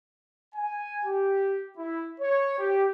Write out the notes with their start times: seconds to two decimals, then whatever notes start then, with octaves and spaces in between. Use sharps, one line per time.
0.55 G#5
1.06 G4
1.77 E4
2.20 C#5
2.59 G4